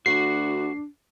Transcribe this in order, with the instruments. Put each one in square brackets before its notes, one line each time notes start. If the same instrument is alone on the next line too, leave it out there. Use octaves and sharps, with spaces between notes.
[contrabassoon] D2 [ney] D4 [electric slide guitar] F#4 F#5 [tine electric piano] C7